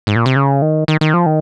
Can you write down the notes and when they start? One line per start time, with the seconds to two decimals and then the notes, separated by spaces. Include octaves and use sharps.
0.07 G#2
0.16 A#2
0.26 C3
0.36 C#3
0.62 D#3
0.88 D#3
1.01 D#3
1.14 F3
1.26 D#3